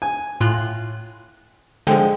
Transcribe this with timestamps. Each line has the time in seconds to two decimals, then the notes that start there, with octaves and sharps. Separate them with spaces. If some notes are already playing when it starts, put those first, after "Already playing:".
0.02 G#5
0.41 A2 F4 F#6
1.87 D3 F3 G#3 G5